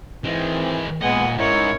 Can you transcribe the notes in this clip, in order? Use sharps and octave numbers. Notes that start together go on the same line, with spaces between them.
D#3 E3 G#3 C4
A#2 G#3 B3 D#5 F#5 G#5
G#2 C#4 D#4 E4 A#4 C#5